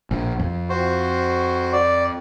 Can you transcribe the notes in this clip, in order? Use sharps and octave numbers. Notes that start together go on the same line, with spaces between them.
A#1
F2
F#4 C5
D5